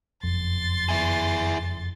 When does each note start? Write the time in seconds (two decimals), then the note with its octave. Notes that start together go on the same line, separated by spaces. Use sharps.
0.23 F#1 F2 C6 A6
0.89 E4 G#4